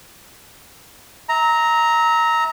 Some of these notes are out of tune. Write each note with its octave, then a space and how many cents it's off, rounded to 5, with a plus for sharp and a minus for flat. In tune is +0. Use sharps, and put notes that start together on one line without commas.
E5 -35 A#5 +0